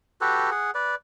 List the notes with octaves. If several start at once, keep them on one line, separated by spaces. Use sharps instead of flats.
F#4 G4 A4 B4
G#4 F#5
B4 D5